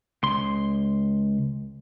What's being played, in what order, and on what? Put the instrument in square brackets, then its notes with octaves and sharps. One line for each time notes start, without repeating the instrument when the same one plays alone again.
[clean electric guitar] C#2 C6